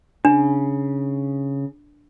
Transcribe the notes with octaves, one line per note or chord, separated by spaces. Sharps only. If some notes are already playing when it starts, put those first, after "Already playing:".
C#3 D4